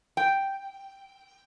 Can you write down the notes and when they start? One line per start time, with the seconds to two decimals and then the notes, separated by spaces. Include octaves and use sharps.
0.17 G5